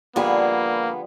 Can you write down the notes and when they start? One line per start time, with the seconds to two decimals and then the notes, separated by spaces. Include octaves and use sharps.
0.16 D3 F3 G3 A#3 B3 G#4 B5